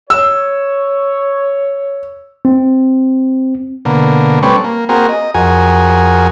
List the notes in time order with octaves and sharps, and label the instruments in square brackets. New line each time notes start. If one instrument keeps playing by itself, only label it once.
[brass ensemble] C#5 [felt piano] E6
[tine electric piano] C4
[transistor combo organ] B2 D3 A#3
G3 A3 C4 C#4 B4 C#6
A#3
A#3 C4 F#4 G#4 A#4
D#5
F2 F#4 G#4 A#4 G#5